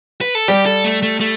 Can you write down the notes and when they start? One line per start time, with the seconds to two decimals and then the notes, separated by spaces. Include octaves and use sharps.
0.21 B4
0.35 A4
0.48 G3 G4
0.66 A4
0.85 A3
1.03 A3
1.20 A3